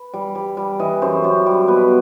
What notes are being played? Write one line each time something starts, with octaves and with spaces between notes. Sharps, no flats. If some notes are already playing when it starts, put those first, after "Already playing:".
Already playing: B4
G3
G3
G3
E3 D#5
F#2 C5
F#2
G3
B2 B4